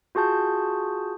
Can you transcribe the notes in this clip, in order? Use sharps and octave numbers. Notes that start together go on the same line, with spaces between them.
F4 F#4 G#4 A5 G6